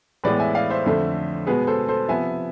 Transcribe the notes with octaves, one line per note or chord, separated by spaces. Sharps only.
A2 E3 G#3 B3 B4 D5
E5 G#5
D5 F5
C5 E5
F2 D3 A3
B2 G#3 B3 G#4 B4
A4 C5
A4 C5
C3 F3 B3 E5 G#5